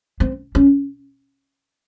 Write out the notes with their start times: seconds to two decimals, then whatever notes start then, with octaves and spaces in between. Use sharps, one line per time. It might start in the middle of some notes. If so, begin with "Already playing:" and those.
0.20 C4
0.55 C#4